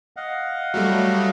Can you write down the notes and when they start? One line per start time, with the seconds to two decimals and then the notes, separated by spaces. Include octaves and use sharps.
0.17 D#5 F5 F#5
0.74 F#3 G3 A3